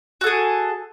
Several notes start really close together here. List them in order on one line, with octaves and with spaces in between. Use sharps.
F#4 A4 G#4